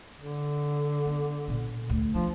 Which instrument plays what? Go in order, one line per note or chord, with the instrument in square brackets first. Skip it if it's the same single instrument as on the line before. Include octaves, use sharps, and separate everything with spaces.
[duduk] D3
[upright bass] B3
A#2 B3
D2
[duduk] F3 [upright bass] D4